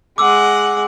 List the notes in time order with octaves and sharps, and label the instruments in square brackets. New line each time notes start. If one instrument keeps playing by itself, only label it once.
[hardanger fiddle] G#3 F#5 [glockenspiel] D6 E6